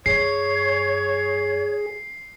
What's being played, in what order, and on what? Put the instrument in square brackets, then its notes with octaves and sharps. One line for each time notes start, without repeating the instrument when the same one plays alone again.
[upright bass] G2 [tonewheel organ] G#4 [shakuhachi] C#5 [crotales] C7